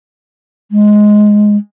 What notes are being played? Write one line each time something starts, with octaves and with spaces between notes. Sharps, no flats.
G#3